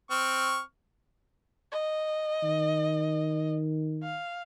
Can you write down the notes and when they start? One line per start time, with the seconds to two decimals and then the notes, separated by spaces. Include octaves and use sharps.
0.11 C4 C#6 F6
1.72 D#5
2.43 D#3
4.03 F5